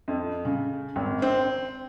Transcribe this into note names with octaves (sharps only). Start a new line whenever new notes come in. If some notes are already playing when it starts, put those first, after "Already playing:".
F2
C#3
G#1
C4